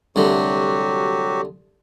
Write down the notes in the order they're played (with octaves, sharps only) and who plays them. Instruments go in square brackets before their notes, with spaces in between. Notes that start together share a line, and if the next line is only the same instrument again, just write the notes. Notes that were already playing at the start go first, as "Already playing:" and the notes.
[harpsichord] C2 D3 A3 [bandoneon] F#3 F#4 G4